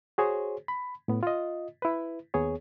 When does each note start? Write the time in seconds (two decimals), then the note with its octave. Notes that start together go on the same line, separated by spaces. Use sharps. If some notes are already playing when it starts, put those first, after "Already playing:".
0.18 F#4 G#4 C5 C#5
0.68 B5
1.08 A2 B3
1.23 F4 D#5
1.82 E4 B4
2.34 D#2 B3 G#4 C#5